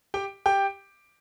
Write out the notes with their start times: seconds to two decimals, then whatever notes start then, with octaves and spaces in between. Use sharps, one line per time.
0.14 G4 G5
0.46 G4 G5